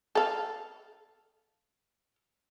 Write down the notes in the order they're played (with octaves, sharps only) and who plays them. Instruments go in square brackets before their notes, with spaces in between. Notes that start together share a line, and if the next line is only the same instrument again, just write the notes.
[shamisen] A4 F5